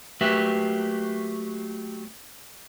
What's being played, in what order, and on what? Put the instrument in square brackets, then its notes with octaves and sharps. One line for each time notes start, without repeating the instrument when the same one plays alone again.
[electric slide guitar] F#3 A3 A#3 G4 B4 E5